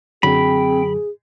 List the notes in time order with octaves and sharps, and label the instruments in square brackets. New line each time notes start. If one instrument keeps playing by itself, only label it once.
[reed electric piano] F#2 D3 F#3 [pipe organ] C4 G5 [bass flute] G#4 [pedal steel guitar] B5